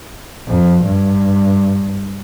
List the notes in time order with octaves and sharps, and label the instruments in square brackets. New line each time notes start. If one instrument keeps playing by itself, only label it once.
[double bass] F2
G2